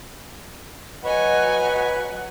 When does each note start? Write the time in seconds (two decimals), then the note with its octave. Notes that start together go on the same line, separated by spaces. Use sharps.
1.04 F#3 B4 C#5 D#5 F#5 G#5